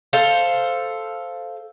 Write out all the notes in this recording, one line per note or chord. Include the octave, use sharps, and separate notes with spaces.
A4 C5 F5